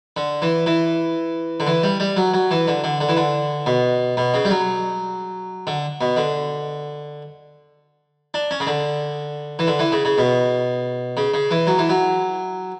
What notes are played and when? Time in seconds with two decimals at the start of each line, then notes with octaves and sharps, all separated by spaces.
0.17 D3
0.42 E3
0.66 E3
1.60 D3
1.67 E3
1.83 G3
2.00 G3
2.17 F#3
2.34 F#3
2.51 E3
2.68 D3
2.84 D3
3.01 D3
3.09 E3
3.17 D3
3.66 B2
4.17 B2
4.34 C#3
4.45 G3
4.50 F#3
5.67 D3
6.01 B2
6.17 D3
8.34 D4
8.51 C#4
8.60 C#3
8.67 D3
9.59 E3
9.67 D3
9.79 E3
9.92 C#3
10.05 C#3
10.18 B2
11.17 C#3
11.34 C#3
11.51 E3
11.67 F#3
11.78 E3
11.90 F#3